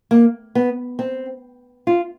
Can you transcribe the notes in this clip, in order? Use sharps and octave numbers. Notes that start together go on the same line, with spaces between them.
A#3
B3
C4
F4